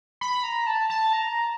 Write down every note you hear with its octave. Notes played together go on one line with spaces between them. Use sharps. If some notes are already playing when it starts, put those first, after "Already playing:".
B5
A#5
A5
A5
A#5